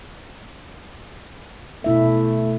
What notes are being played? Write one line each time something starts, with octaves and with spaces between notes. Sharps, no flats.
B2 A3 E4 E5